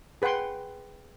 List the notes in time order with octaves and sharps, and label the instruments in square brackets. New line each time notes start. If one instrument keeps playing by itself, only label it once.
[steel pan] G#4 B4 F#5 G5 C6